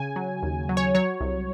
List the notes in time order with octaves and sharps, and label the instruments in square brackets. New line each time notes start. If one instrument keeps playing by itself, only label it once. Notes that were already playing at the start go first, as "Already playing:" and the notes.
Already playing: [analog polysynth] C#3 G#5
F#3
D#2
F#3
C#5
F#3 C#5
C2